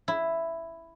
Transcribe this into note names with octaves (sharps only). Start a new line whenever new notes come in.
E4